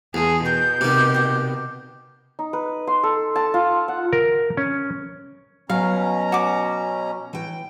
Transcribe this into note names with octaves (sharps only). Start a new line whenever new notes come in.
E2 E4 F4 G#4 A5
B2 A#4 C#5 G5 G6
C3 D#3 B4 D6
G4 F#5
D#4
B4
C6
A4
A5
F4
F#5
A#4
C#4
B2 F#3 C#4 F5 A#5
F#4 D6
E3 G5